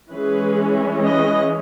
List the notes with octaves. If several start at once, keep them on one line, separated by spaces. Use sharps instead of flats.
E3 G#3 C#4 G#4 B4
B4 D#5